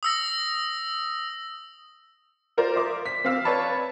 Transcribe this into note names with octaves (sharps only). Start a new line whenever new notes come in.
D#6 E6 A#6
F4 A#4 C5 D5
E5 C6 D6
B6
C4 F5 E6
B4 C#5 D5 A5 B5